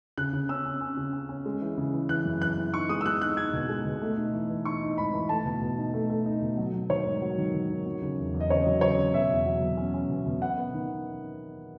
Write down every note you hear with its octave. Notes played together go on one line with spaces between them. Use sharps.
C#3 F#6
C#3
C#4 E6
C#4
C#4
C#3
C#4
C#4
G#3
E3
C#3
E3
E3 F#6
F#2
E3 F#6
E3
D#4 C#6
G#3 D#6
E6
G#3 F#6
D#4 F#6
D#4 G#6
B2
G#3
B2
A3
D#4
E3
E3
D#4 C#6
D#4
G#2 B5
E3
A3 A5
B2
B2
D#4
A3
A3
D#4
B2
F#3
F#3
D#3 C#5
G#2
F#3
D#3
D#3
D#3
F#3
C#3
E2
E2
D#5
C#3 C#5
F#3
C#3 C#5
C#3
B2 E5
E2
F#3
B2
C#4
C#4
B2
B2
B3 F#5
B3
D#3